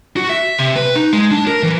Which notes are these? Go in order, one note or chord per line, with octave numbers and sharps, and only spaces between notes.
F#4
E5
C3
B4
D#4
G#3
D4
A#4
E3